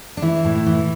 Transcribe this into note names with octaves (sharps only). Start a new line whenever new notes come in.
D4
E3 E4
A2
E3